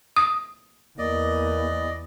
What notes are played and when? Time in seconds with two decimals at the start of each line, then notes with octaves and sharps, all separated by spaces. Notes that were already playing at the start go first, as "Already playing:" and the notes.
0.16 D#6
0.98 E2 A#3 D5 D#5